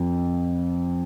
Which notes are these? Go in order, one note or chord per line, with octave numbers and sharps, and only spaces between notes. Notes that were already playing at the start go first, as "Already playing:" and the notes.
Already playing: F2